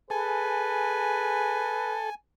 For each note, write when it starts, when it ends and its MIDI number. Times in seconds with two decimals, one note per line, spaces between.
0.10 1.78 68
0.10 2.10 69
0.10 1.97 71
0.10 2.14 80